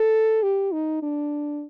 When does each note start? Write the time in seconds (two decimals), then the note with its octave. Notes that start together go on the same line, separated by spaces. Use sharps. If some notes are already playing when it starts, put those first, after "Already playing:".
Already playing: A4
0.43 G4
0.72 D#4
1.02 D4